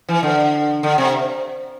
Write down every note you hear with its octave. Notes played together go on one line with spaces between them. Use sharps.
E3
D3
D3
C3